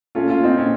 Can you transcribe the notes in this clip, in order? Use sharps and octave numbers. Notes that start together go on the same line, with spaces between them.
A#2 A3 C#4 F4
C#4 F4
C4 D#4
A#2 C#4